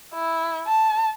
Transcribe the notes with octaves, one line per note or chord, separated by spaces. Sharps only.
E4
A5